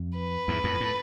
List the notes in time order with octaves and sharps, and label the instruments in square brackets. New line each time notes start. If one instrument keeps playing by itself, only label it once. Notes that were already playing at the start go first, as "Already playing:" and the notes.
Already playing: [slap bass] F2
[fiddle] B4
[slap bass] E2 G#2
F2 A2
A2